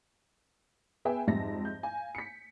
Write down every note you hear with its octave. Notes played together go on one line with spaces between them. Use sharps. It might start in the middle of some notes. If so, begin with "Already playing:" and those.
B3 G#4 B4 E5 G5 G#5
F2 G#2 G3 E5 A5 A#6
G6
F5 G#5
B6 C#7